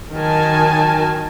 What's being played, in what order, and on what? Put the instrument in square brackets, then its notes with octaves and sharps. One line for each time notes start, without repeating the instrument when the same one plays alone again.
[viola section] D#3 F#3 A#4 G#5 A5